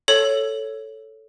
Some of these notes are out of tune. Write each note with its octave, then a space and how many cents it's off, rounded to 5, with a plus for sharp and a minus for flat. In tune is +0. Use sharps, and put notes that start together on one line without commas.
A4 +0 C#5 +0